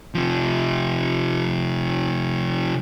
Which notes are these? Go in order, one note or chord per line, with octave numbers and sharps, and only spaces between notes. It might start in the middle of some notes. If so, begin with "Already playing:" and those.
C3 F3